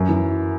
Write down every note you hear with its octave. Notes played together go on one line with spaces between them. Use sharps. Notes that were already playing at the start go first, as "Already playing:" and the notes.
Already playing: F#2
E3